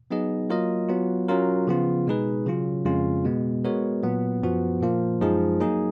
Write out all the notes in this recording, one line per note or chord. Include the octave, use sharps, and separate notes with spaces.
F#3 B3 D#4 G#4 D#5
F#3 A#3 F4 A#4 D#5
F#3 B3 F4
F#3 C#4 F4 A#4
C#3 F3 B3 F4
B2 G#3 D#4 G#4 B4
C#3 F#3 C#4 F4
F2 C#3 G#3 C#4 F4
B2 G#3 B3
G#3 B3 F#4 A#4 C#5
A#2 F#3 B3
F#2 F3 B3 F#4
A#2 F3 A#3 F4
F#2 F3 G#3 D#4 G#4
F#3 A#3 D#4 G#4